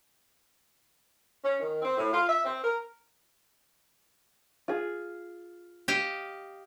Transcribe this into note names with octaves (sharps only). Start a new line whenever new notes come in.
C#4
D#3
C4
A2
F4
E5
C4
A#4
F4 G#4
G4 D#5 F5